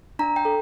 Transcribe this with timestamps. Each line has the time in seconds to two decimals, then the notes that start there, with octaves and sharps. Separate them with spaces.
0.19 D4 A#5
0.36 G5
0.45 A4